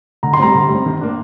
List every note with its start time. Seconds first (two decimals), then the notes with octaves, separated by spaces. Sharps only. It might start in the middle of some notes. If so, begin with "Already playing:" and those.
0.23 D3 A#5
0.33 C6
0.39 G3 C4 A#5
0.54 D3
0.69 G3
0.75 C4
0.86 D#3
1.01 A#3 D4